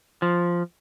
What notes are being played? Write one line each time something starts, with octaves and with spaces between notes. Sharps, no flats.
F3